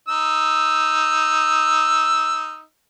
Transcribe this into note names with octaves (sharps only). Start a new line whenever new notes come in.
D#4 E6